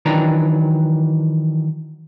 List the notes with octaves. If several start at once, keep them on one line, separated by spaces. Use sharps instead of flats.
D#3 E3 F#3 D4 A#5